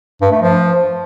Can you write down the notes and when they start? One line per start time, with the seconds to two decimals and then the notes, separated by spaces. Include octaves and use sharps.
0.21 G2
0.31 A3
0.41 F3